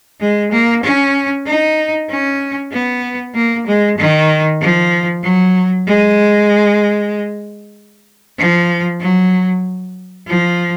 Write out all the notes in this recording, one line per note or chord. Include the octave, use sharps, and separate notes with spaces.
G#3
A#3
C#4
D#4
C#4
B3
A#3
G#3
D#3
F3
F#3
G#3
F3
F#3
F3